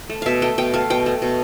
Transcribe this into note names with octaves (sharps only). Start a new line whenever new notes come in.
A3
B2 E5 F5
A3 G5
B2 G5
A3 F5
B2 G5
A3
B2